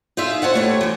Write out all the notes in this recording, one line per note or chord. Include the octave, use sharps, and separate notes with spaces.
D#4 F4 G#4 E5
C5 C#5 D#5 F#5 A5
G3 A3 C#5
E3 F3